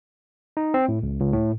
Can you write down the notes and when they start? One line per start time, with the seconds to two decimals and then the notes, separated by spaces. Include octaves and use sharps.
0.57 D#4
0.74 C4
0.88 A2
1.03 C#2
1.19 C#2
1.33 A2